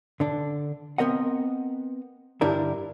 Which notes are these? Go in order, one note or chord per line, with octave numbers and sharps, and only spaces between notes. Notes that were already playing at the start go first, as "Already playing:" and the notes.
D3 D4
B3 C4 A#4 D#5 F#5
G2 D3 G3 D4 E4 A#4